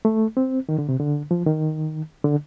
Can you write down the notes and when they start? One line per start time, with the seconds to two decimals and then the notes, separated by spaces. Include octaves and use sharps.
0.05 A3
0.37 C4
0.69 D#3
0.78 D3
0.89 C3
1.00 D3
1.31 F3
1.46 D#3
2.24 D3